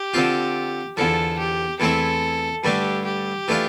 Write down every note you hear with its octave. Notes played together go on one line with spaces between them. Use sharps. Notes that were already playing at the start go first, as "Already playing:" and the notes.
Already playing: G4
D3 F3 C4 F4
E2 D3 F3 A4
G4
E2 E3 A3 C4 E4 A4
G2 D3 A3 D4 G4
G4
E3 A3 D4 F4